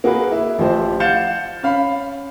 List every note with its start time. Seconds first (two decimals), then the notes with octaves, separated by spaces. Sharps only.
0.04 A#3 F#4 G#4 B4
0.31 E4
0.59 A1 F3 E4 G4 C5
1.00 F5 F#5 G6 A6 C#7 E7
1.63 C#4 F5 B5